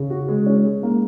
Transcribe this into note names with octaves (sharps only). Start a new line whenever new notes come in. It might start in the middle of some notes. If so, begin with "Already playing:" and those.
Already playing: C#3
F#4
G#3
C#4
G#3
A#3